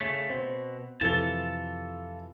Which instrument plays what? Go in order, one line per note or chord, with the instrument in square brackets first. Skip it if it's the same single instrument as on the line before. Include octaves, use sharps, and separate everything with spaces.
[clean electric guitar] C#3 A3 [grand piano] C#4
[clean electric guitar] B2 [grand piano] C4
[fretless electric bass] F2 C3 F3 [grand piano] E3 A4 G7 [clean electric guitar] F4 A5